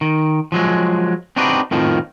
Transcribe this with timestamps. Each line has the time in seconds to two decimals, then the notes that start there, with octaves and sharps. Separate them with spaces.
0.01 D#3
0.52 F3 F#3 G#3
1.36 C4 D4 D#4 F#4 G4 B4
1.71 F2 A2 D#3 F3